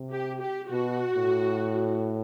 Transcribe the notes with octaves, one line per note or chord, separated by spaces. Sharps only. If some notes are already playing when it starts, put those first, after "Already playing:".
Already playing: C3
G4
G4
B2 F#4
A2